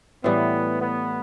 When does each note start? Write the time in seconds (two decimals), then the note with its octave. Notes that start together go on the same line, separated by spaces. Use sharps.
0.24 A2 E3 G3 B3
0.80 B3